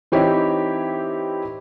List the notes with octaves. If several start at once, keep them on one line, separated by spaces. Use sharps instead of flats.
E3 C4 D#4 E4 G4 C#5